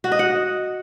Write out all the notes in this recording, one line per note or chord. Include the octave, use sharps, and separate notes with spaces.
F#4
D#5
F#5